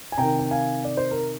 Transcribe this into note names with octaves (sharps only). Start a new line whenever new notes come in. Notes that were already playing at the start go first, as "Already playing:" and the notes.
G#5
C3 D#3 G5 A#5
G5
F5 G#5
D5
C5
A#4